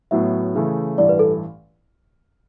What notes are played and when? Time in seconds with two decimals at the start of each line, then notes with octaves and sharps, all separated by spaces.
0.11 A2 F#3 B3 E5
0.55 C#3 E3 A3
0.98 A1 G2 E3 D5
1.09 B4
1.19 A4